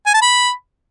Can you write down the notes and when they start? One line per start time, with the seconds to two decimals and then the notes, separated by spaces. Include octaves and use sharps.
0.06 G#5
0.14 A5
0.22 B5